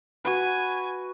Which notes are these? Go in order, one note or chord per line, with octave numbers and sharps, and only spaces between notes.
F#4 B4 G#5